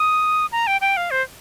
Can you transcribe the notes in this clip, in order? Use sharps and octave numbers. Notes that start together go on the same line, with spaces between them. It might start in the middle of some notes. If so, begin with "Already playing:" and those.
Already playing: D#6
A#5
G5
G5
F5
C5